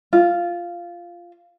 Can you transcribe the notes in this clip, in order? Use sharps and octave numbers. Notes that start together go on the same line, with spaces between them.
F4